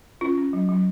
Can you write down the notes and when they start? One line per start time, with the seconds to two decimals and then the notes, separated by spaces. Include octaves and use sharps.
0.21 C#4 F4
0.38 C#4
0.53 F#3
0.69 F#3